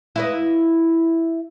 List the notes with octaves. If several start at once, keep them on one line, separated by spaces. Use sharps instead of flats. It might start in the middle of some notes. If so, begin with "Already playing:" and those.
E4 B4 D#5